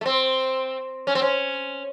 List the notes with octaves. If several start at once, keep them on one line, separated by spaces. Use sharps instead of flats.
A3
C4
C#4
C4
C#4